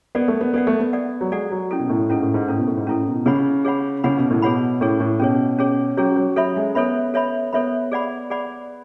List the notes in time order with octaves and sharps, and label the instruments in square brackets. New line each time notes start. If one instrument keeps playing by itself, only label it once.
[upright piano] B3 [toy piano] A4 D5 F#5
[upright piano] A3
B3
[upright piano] B3 [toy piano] A4 D5 F#5
[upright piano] A3
B3
[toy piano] A4 D5 F#5
[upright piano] F#3
[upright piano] G#3 [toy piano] A4 D5 F#5
[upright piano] F#3
[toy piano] C#4 E4 A4
[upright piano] B2
A2
[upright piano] G#2 [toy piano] C#4 E4 A4
[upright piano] A2
G#2
[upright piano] A2 [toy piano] C#4 E4 A4
[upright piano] B2
A2
G#2
[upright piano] A2 [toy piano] C#4 E4 A4
[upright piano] B2
[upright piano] C#3 [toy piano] G#4 C#5 F#5 B5
[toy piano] G#4 C#5 F#5 B5
[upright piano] C#3 [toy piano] G#4 C#5 F#5 B5
[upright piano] B2
A2
[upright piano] B2 [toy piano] G#4 C#5 F#5 B5
[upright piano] A2 [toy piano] C#4 G#4 C#5
[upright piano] A2
[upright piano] B2 [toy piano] C#4 G#4 C#5
[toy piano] C#4 G#4 C#5
[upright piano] F#3 [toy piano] C#4 G#4 C#5
[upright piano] F#3
[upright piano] F#3 [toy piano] A4 C#5 E5 B5
[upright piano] G#3
[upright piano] B3 [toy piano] A4 C#5 E5 B5
[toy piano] A4 C#5 E5 B5
[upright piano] B3 [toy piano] A4 C#5 E5 B5
[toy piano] G#4 D5 F#5 B5
G#4 D5 F#5 B5